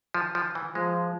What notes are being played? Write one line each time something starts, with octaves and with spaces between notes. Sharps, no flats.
F3
F3
E3
F3 G#3